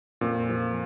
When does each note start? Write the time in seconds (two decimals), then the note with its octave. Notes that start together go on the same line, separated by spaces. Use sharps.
0.21 F2 A#2
0.49 F3